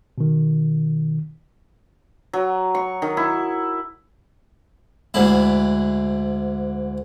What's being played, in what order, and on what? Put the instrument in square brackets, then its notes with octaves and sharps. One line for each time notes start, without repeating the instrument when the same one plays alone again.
[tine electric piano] B2 D#3
[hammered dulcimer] F#3
C#6
D#3
E4
[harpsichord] D2 G#2 E4